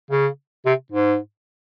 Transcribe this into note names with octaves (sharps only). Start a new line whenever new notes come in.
C#3
C3
G#2